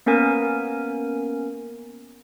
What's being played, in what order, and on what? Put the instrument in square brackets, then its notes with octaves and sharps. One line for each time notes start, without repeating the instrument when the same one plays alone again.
[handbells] A#3 B3 C#4 A#4 G#5